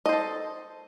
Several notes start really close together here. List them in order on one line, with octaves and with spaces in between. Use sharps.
D#5 C5 A4